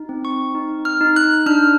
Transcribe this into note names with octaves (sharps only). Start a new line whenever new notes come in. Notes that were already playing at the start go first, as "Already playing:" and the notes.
Already playing: D#4
C4
C#6
D#4
F6
D#4
F#6
D4 F6